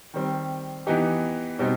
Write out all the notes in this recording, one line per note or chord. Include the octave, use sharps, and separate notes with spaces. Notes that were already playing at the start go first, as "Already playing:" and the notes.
D#3 G3 C4
E3 B3 D#4 G4
B2 G3 C4 D#4